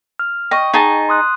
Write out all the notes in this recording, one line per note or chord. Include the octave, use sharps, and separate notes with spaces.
F6
D#5 G5 C#6
D#4 G#4 A5
C6 D#6 F#6